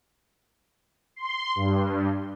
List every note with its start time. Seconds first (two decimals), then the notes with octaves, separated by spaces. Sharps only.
1.16 C6
1.56 G2